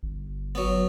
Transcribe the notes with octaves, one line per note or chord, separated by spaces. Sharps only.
G1
F#3 B3